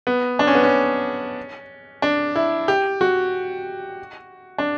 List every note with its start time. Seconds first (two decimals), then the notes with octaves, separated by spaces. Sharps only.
0.07 B3
0.39 D4
0.47 C#4
0.55 B3
0.63 C#4
2.02 D4
2.36 E4
2.68 G4
3.01 F#4
4.58 D4